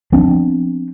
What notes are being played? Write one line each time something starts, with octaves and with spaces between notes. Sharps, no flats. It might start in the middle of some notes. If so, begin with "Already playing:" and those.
F3 B3 C4 D4